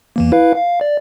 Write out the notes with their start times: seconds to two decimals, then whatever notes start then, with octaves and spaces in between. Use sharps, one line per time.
0.16 E2 E3 A#3
0.32 E4 B4 F5
0.56 F5
0.81 D5